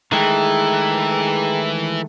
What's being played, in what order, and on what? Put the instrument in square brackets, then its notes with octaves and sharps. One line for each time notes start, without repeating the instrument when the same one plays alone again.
[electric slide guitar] D#3 G#3 A3 [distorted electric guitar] E3 [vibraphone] G#4 G5 A#5